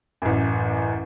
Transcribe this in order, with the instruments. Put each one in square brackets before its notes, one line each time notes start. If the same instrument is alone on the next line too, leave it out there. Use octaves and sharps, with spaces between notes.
[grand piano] A1 F#2